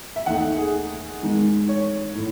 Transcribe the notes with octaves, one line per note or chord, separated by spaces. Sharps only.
E5
D#2 D#3 A3 D#4 F#5
G#4
G#2 D#3 G#3
C#5
A2